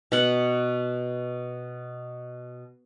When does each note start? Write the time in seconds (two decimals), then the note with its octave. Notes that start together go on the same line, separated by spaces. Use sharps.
0.12 B2 F#5